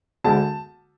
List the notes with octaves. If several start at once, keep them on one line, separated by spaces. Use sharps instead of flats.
D2 D3 G#3 A5